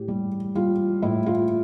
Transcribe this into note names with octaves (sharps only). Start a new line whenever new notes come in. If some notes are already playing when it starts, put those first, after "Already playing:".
Already playing: A2 G4
G3
G3 F4
A2 E4
F4